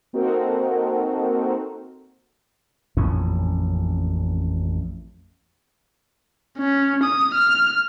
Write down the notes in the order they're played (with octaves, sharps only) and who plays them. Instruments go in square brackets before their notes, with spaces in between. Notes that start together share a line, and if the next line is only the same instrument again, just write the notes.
[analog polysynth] A#3 C4 D#4 F#4 A4 A#4
[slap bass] A1 F2 A#2 C#4
[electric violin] C#4
D#6
F6